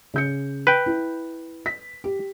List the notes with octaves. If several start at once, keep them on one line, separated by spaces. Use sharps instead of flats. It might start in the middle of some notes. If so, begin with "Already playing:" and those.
C#3 G6 C#7
B4 G5
E4
B6
G4